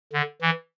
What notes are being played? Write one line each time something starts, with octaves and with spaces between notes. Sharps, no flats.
D3
E3